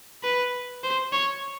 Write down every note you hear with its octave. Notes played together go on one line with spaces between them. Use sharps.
B4
C5
C#5